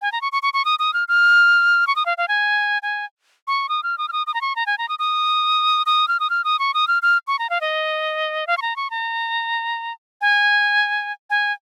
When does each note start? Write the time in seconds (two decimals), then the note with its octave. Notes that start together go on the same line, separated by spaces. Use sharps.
0.02 G#5
0.12 A#5
0.21 C#6
0.32 C#6
0.43 C#6
0.54 C#6
0.65 D#6
0.79 D#6
0.94 F6
1.08 F6
1.87 C#6
1.96 D#6
2.06 F5
2.18 F5
2.28 G#5
2.82 G#5
3.47 C#6
3.69 D#6
3.83 F6
3.98 D#6
4.08 F6
4.13 D#6
4.27 D#6
4.34 A#5
4.41 C#6
4.56 A#5
4.66 G#5
4.78 A#5
4.89 D#6
4.99 D#6
5.86 D#6
6.08 F6
6.20 D#6
6.30 F6
6.44 D#6
6.59 C#6
6.74 D#6
6.88 F6
7.03 F6
7.27 C#6
7.39 A#5
7.50 F5
7.61 D#5
8.47 F5
8.57 C#6
8.62 A#5
8.76 C#6
8.90 A#5
10.21 G#5
11.30 G#5